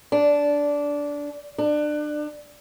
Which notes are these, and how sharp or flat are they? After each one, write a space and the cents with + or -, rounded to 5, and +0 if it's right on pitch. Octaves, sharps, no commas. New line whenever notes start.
D4 -15
D4 +25